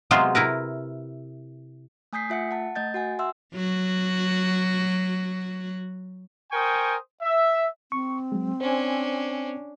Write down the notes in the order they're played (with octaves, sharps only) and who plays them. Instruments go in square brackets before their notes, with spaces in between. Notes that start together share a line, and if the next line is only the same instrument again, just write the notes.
[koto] C3 F#3 G#3 B3 F4 C5
C3 E4 A#4 B4
[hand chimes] A3 G#5 D#6 G6 B6 C7
A3 F4 E5 F#5 C#7
F#5 A5
A3 D#5 G6 A6
F#4 F#5 G#5
E5 F#5 C6 E6
[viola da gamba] F#3 F#4
[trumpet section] A#4 C5 G5 G#5 C#6 D#6
E5
[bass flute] C4 [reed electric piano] C#6
[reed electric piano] F#3 G#3
[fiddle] C#4 D4 [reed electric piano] C5 G#5